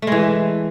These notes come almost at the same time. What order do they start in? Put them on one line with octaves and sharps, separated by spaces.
A3 G#3 E3